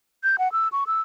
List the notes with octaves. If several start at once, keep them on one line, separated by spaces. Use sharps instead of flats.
G6
F#5
E6
C#6
E6